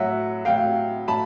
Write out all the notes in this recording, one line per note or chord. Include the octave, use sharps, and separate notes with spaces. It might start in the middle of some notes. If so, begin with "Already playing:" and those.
Already playing: A2 F#3 E5 F#5
A2 F#3 F5 G5
A2 F#3 A5 B5